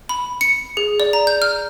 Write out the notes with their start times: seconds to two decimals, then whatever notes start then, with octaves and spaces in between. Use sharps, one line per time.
0.09 B5
0.41 C#7
0.77 G#4
1.00 D5
1.13 A#5
1.27 G6
1.42 F6